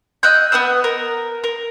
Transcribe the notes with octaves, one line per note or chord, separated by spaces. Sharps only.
D#5 E6 F#6 G6
B3 B4 D#6 E6
A#4
A#4